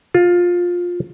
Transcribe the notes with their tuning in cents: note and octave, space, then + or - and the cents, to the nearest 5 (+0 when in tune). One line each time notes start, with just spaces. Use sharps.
F4 +15